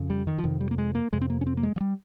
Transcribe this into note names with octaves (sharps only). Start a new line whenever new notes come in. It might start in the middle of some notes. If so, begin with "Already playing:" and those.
Already playing: F2 C#3
G3
D#3
F3
F2 C3 D#3
G3
A#3
G#3
A#3
F2 C3 G#3
C4
A#3
C#4
C4
A#3
G#3
F3
G3